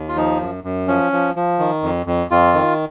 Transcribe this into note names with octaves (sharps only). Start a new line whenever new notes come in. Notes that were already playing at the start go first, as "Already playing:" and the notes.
Already playing: D#2
F4
F3 D#4
F#2
F#2
F3 C#4
F3
F3
D#3
F2
F2
F2 F4
D#3